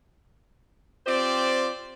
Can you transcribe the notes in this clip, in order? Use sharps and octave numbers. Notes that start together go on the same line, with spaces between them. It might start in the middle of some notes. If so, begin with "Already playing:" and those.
C4 F4 G4 C5 D5